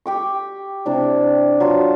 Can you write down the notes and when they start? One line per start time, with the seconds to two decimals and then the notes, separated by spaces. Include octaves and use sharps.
0.06 G4 G5 C#6
0.86 C3 D4 E4
1.60 F#3 F4 A5